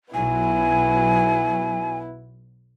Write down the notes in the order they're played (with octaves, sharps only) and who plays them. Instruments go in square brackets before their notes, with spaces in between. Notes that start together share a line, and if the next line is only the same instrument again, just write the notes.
[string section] B1 F#3 [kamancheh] B3 E4 [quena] G#5